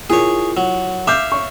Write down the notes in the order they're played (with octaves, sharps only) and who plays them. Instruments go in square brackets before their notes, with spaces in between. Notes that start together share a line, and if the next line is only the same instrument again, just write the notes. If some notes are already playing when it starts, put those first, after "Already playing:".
[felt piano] E4 F4 A#4 [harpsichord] G#4 C#5
[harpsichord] F#3
[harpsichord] E5 F5 [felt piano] D6 G6
[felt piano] C#5 C#6